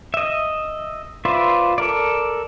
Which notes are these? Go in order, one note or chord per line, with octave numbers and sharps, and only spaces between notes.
D#5 E5
F4 B4 C5 D5 E5
A4 A#4 D5